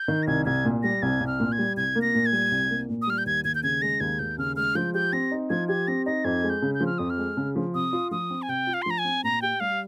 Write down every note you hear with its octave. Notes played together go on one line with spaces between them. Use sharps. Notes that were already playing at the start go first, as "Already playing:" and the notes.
Already playing: G6
D#3
A#6
C2 G#6
C2 G#6
A#2
G3 A#6
C2 G#6
C2
F6
A#2
G#6
G3
C2 G#6
A#3
A#6
A#2
G#6
G3
C2
A#3
A#2
D#6
G3 F6
G6
D#2 G#6
D#2 G#6
G6
C#3 G#6
G#3 A#6
D#2 G#6
D#2 G6
C#3 F6
G#3 F6
F3 G6
G4 G6
C4 A#6
D#4
F3 G#6
G4 G#6
C4 A#6
D#4 A#6
F2 G#6
G#3
G6
C#3
G6
F3
F6
F2 D#6
F6
G#3
C#3
F3
C3 D#6
F4
F3 D#6
C4
G#5
C3 G5
F4
F5
C6
F3 A#5
G#5
C4
A#2 A#5
G4 G5
G3 F5